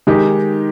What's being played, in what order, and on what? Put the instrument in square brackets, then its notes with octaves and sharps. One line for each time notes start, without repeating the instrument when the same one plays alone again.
[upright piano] D#3 G#3 D#4 G4